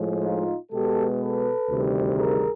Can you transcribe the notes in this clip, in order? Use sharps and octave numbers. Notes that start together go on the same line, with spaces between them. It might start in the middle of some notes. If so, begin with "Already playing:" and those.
Already playing: A2 F3 G#3
D#4 F4
B2 G#3 B3 G4 A4
A4 B4
D2 C3 D#3 G3
G#4 A#4